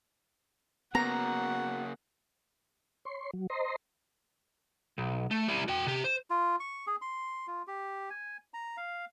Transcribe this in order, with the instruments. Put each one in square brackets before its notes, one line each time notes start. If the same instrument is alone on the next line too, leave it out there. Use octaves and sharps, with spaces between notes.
[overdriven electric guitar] C#3 A#3 [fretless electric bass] B3 [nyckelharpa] F#4 F#5 [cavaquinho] A#5
[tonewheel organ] C#5 C6
F#3
C5 D#5 A#5 C6
[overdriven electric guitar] B1
A3
G3 E4
F#4 G5
C3 G4
C5
[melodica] F4
C#6
G#4
C6
F4
G4
G#5
A#5
F5